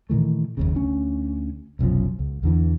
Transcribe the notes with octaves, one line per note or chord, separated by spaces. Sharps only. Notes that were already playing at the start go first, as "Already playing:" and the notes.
A#2 D#3 E3 A3
F#1 D#2 C#3
D2 C#4
F1 B1 F#2 F3
C#2
E2 D3 E3